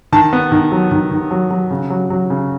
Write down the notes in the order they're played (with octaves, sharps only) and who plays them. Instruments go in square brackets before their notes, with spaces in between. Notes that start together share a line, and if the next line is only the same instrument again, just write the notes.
[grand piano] D#3 A5
B3
D#3
F#3
D#3
D#3
F#3
F#3
C#3
F#3
F#3
C#3